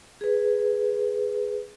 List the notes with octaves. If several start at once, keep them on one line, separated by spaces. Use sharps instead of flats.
G#4 B4